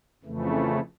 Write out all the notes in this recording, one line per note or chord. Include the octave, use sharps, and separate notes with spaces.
F2 C#3 E3 A3